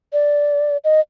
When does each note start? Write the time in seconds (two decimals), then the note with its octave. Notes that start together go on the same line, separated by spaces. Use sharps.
0.13 D5
0.84 D#5